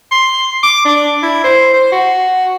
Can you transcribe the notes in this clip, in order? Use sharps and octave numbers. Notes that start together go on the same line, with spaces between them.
C6
D6
D4
E4
C5
C5
F#4